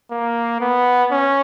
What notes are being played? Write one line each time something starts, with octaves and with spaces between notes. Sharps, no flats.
A#3
B3
C#4